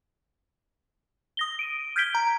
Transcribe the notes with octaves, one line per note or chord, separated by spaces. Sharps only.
D#6 A#6 G7
D7 D#7
F6 G6 G#6 B6 D7 G7
A#5